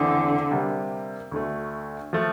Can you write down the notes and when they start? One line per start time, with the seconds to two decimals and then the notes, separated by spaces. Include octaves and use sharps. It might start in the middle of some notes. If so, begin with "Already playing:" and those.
Already playing: E2 D3 E3 A3 C4
0.51 C3 G3 A#3
1.32 D2 D3 A3
2.13 F3 A3